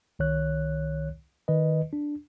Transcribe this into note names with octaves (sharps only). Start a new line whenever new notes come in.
C2 D#3 C#5 F#6
D#3 B4 D#5
D4